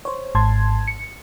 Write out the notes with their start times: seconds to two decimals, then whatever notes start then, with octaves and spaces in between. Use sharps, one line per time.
0.05 C5 C#5
0.35 G#1 G#2 A5 C6 G#6
0.88 C#7